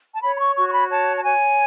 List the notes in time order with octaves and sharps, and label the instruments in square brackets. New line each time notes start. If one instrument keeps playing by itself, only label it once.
[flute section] A5
C#5 B5
B5
C#6
F#4 C#6
C#6
B5
C#5 A5
A5
C#5 G#5